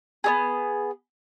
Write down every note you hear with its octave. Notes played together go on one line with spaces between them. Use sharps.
B3 D#4 G#4